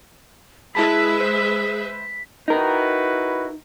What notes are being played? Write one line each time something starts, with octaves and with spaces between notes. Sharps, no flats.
G#3 E4 G#4 B4 E5 A5 B5 B6
C5
D#4 E4 F#4 A#4 B4